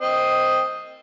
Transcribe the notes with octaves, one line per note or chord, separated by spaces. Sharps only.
C4 D#5 G5